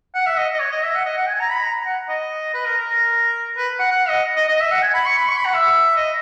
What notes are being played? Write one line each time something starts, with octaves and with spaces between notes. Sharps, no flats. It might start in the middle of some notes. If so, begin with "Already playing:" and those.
F#5
E5
D#5
D#5
C#5
D#5
E5
F#5
D#5
F#5
G#5
A#5
B5
A#5
F#5
D#5
B4
A#4
A#4
B4
F#5
F#5
D#5
D#5
D#5
E5
F#5
G#5
B5
C#6
B5
C#6
B5
F#5
E5
D#5